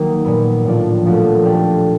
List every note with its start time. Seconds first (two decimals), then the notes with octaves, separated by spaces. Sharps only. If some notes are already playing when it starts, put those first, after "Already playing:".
Already playing: D#3 F#3 A#3 D#4
0.25 A#2 F#3 B3
0.65 A2 F3 A3 D4 F4
1.05 A#2 F3 A3 C#4 F#4
1.45 A3 D4 G4